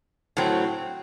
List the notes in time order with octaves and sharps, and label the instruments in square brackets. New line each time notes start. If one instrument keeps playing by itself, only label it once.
[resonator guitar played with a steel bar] A2 F#3 C4